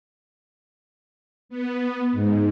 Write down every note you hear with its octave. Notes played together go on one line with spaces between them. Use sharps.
B3
G#2